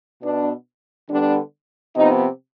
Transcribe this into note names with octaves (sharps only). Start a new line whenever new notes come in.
B2 B3 D4
D3 G3 B3 D4
C3 F3 B3 D#4